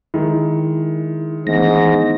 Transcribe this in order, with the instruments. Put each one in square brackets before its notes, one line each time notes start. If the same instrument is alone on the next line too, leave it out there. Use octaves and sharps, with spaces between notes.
[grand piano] D#3 G#3 [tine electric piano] E4
[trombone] G#2 [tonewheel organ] E3 A#6 [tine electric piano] A3 B3 D4